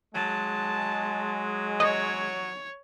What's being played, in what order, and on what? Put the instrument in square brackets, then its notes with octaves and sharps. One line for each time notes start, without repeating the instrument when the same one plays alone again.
[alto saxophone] F#3 [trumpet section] G#3 [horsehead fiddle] A5
[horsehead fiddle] C#5 [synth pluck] D#5